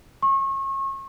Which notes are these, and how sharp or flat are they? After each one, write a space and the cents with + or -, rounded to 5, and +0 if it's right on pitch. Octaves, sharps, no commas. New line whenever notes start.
C#6 -35